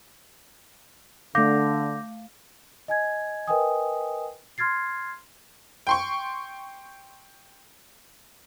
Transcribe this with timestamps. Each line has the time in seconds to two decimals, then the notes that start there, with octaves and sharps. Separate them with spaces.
1.35 D3 A3 F5 D6 G6 A#6
2.88 D#5 G#5 G#6
3.47 A#4 B4 D#5 G5 G#5 D#6
4.58 C6 F6 G#6 A6 C7
5.87 G5 C6 C#6